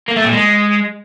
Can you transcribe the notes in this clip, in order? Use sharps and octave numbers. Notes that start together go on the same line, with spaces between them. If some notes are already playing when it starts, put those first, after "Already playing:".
A#3
A3
A#2
G#3